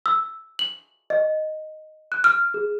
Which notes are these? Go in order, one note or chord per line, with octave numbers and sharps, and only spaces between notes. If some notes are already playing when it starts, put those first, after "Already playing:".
E6
F#7
D#5
F#6
F6
G#4